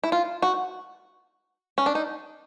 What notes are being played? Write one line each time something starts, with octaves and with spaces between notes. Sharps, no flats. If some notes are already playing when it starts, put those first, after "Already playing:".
E4
F4
F#4
C#4
D4
D#4